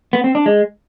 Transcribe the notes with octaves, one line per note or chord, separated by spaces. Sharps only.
B3
C4
D4
G#3